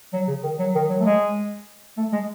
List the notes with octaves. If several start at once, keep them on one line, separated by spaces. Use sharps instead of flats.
F#3
C#3
D#3
F#3
D#3
F#3
A3
G#3
A3
G#3